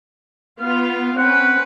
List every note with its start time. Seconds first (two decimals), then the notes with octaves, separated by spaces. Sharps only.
0.59 B3 F4 F5
1.18 C4 C#4 B4 F#5